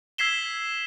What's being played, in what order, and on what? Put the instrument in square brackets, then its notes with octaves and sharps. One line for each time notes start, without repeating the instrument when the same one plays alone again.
[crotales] E6 G#6 B6 C7 E7 G7